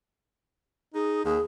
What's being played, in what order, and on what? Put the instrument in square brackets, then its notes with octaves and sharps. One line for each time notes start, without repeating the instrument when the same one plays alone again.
[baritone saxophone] D#4 [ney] G#4
[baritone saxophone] D#2 [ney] G#4